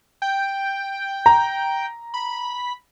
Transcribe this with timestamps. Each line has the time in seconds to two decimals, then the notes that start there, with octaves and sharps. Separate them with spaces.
0.22 G5
1.26 A#5
2.14 B5